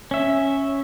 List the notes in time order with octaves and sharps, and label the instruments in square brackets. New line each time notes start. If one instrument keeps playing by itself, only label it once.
[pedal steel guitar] C#4 E5